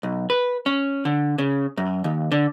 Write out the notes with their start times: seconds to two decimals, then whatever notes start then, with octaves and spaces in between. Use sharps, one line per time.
0.03 B1
0.30 B4
0.66 C#4
1.05 D3
1.38 C#3
1.77 F#2
2.04 D#2
2.32 D3